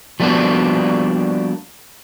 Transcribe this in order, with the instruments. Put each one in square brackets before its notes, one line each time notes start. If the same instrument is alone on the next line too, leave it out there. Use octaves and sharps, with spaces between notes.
[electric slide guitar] F3 G3 A#3 B3 D4 F#4